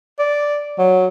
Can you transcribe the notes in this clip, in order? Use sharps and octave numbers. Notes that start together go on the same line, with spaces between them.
D5
F#3